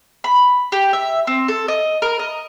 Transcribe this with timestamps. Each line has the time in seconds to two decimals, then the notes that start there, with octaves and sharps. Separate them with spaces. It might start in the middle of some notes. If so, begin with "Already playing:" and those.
0.24 B5
0.72 G4
0.93 E5
1.27 C4
1.48 A4
1.68 D#5
2.02 A#4
2.19 D#5